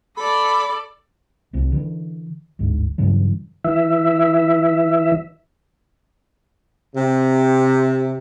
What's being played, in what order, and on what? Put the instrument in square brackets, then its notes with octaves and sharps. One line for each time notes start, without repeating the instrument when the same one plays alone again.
[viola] A4 D5 [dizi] B5
[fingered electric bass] F1 C2 C3
D3 E3
G1 D2 G#2
G2 C#3 E3 F#3
[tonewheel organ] E3 E5
[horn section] C3